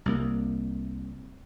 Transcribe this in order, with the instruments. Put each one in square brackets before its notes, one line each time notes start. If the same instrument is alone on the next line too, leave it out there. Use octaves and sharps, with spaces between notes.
[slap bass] C2 A#3